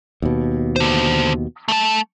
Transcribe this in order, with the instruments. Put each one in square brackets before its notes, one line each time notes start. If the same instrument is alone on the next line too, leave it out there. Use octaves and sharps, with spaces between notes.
[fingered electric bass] D#2 B2
[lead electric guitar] D3 C5
A3 A5